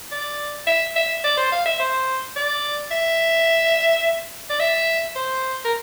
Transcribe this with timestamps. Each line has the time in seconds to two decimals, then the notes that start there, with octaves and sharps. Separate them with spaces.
0.12 D5
0.67 E5
0.96 E5
1.24 D5
1.38 C5
1.52 F5
1.66 E5
1.80 C5
2.36 D5
2.91 E5
4.50 D5
4.60 E5
5.16 C5
5.65 A#4